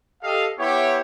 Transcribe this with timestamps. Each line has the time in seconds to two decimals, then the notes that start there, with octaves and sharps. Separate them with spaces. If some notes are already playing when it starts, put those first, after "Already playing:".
0.22 G4 A4 D#5 F5
0.58 B3 E4 G4 C#5